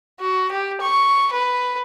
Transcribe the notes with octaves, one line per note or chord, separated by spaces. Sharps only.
F#4
G4
C#6
B4